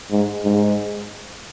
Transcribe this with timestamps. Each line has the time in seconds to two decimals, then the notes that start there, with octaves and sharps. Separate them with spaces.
0.11 G#2
0.45 G#2